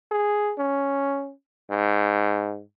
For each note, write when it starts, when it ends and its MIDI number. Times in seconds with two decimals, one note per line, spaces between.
0.12 0.53 68
0.58 1.32 61
1.70 2.62 44